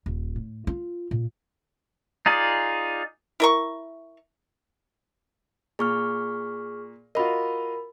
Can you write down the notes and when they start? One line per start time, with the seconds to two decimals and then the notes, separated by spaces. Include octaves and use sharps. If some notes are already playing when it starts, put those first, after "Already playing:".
0.06 D#1
0.36 A2
0.67 F4
1.11 A#2
2.26 D#4 F4 G#4 D5
3.40 E4 A#4 C#6
5.79 A#2 G#4 C#6 F6
7.15 F4 F#4 A#4 D#5 B5